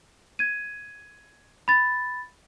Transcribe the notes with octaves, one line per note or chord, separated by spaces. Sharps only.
G#6 D#7
B5 A6